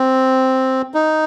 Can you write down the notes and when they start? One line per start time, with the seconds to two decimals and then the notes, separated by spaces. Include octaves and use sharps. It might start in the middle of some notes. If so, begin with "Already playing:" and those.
Already playing: C4
0.94 D#4